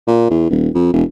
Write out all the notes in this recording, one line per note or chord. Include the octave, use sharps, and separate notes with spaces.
A#2
E2
D#1
F2
E1